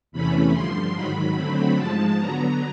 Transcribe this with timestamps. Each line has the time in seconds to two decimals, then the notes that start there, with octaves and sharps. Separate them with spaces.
0.12 E2 C3 E3 A3 C#4 B5
0.53 G2 D3 F3 C6
0.95 G#2 D#3 F#3 B5
1.36 D3 F#3 A3 C4 B5
1.76 G#2 F3 G#3 A5
2.19 D3 F#3 B3 A#5